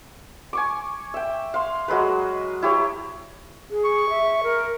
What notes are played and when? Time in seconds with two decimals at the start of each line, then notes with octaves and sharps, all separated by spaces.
0.53 G#5 C#6 D6
1.14 E5 G5
1.54 F5 C6
1.88 F#3 G#3 A#4 B4
2.62 E4 G4 C#5 A#5
3.71 G#4
3.85 C#6
4.10 E5
4.43 A#4